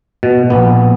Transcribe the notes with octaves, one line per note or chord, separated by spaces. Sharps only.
B2
A#1 B3